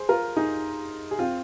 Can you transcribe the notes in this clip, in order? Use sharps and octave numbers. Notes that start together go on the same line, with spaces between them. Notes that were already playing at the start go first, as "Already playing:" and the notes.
Already playing: G#4 C5
F4 A#4
D#4 G#4
G#4
C4 F4